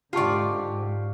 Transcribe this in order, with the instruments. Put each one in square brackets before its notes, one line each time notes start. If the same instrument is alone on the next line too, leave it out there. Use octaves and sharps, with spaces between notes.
[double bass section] G#2 D3 [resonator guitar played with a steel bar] F4 D5 [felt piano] G4 A5 C#6